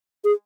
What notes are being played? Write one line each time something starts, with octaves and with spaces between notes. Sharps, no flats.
G#4